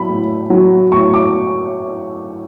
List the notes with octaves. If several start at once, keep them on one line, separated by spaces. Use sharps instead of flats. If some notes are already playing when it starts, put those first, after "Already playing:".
Already playing: F#3 B5
A2
F#3
A2 C#6
D6